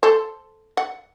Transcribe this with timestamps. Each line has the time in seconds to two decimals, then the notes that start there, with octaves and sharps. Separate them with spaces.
0.03 A4 C5
0.77 F#5